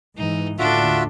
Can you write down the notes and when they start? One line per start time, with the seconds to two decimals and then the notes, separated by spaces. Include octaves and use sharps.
0.17 G#2 E3 D#4
0.59 D#2 A2 D3 D4 F4 F#4 A4 E5